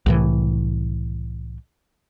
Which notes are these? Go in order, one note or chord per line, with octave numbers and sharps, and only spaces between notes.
C2 A2 E3